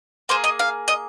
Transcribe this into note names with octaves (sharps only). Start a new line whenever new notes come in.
A#3 G#4 C5
D#5
F5
D#5